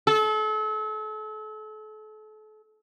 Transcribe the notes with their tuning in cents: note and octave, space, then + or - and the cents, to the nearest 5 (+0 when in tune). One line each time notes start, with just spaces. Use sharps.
A4 -35